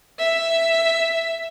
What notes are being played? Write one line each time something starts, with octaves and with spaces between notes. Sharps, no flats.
E5